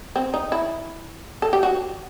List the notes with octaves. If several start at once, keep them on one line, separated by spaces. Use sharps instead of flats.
C4
D#4
E4
A4
G4
F#4